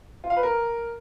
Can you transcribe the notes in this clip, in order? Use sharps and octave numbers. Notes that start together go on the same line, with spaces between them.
F4
F5
B4
A#4